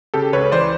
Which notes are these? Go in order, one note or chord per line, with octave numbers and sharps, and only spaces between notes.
C#3 G4 A4
C#2 B4 C#5
E3 C5 D5